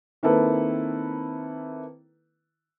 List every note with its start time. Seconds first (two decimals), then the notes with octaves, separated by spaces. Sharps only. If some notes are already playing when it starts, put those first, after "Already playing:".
0.23 D#3 A#3 C4 E4 A4 B4